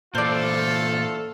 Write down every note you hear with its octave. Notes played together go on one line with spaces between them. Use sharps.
A#2 E3 A3 F4 A4 C5 D5